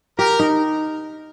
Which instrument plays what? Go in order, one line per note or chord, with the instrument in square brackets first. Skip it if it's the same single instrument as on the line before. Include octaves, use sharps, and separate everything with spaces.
[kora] G4 [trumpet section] A#4
[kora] D#4